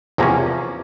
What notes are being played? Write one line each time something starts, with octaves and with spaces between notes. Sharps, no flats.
E2 C3 F3 A#3 C#4